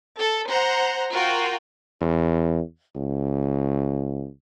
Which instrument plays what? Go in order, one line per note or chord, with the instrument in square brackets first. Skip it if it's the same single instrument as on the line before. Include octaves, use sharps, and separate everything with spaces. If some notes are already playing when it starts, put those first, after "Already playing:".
[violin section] A4
C5 F#5 A#5
F4 F#4 A#4 G5
[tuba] E2
C#2